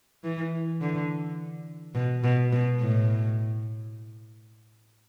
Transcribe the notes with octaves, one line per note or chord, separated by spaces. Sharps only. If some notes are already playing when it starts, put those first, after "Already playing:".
E3
D3
B2
B2
B2
A2